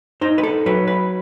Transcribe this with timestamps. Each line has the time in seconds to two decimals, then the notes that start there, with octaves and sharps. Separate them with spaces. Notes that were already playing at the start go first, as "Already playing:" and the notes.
0.21 D#4 C5
0.38 B4
0.43 A4
0.66 F#3 B4
0.87 B4